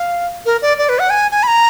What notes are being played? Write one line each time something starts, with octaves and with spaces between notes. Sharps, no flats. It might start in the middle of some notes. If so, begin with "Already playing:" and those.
Already playing: F5
A#4
D5
D5
B4
F#5
G#5
G#5
B5
A#5